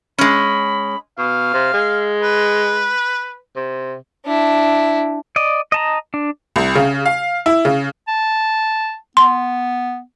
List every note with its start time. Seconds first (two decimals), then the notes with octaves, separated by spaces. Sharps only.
0.18 G#3 C#4 B5
1.18 B2 F5
1.54 C3
1.74 G#3
2.22 B4
3.56 C3
4.25 D4 E4
5.36 D5 D#5
5.72 D#5 A5 A#5
6.14 D4
6.56 C2
6.75 C#3
7.05 F5
7.46 E4
7.65 C#3
8.08 A5
9.17 B3 C6